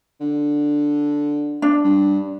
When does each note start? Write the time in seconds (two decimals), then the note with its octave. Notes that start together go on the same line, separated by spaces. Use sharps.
0.21 D3
1.62 D4
1.84 G2